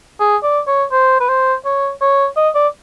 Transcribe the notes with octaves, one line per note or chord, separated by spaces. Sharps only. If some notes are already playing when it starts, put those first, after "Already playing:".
G#4
D5
C#5
C5
B4
C5
C#5
C#5
D#5
D5